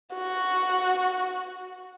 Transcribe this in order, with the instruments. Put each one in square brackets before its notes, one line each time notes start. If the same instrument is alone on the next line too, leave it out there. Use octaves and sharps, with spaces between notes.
[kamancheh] F#4